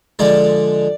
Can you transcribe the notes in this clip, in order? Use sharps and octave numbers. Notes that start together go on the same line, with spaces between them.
D3 F3 G#3 D5